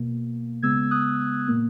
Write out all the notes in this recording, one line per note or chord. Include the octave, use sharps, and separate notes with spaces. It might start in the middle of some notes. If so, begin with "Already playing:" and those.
Already playing: B2 A#3
C#3 G#3 B3 E6 G#6
D#6 F#6
A#2 A#3